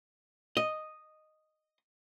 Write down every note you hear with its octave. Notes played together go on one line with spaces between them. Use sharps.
D#5